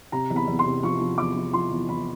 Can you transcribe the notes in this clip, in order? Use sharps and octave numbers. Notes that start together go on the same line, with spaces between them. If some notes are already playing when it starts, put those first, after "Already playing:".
C3 A#5
E2
B5
E2
C6
C3
F3 C#6
F3
E2 D6
F3
F3 C6
E2
E2 B5